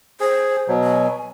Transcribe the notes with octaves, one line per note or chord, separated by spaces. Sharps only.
G#4 C5
B2 F#3
G#5